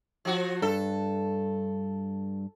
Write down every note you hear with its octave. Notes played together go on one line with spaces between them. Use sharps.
F3 F#4
G2 A4